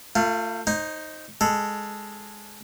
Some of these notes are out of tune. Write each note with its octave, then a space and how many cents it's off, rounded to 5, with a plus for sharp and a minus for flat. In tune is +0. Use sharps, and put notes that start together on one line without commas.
A3 +35 F4 +0
D#4 +0 C5 +25
G#3 +0 A4 +0